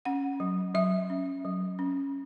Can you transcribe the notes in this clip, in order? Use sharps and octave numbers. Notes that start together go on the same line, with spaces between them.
C#4 F#5
F#3
F#3 E5
C#4
F#3
C#4